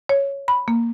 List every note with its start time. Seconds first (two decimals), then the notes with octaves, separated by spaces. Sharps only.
0.09 C#5
0.48 B5
0.68 A#3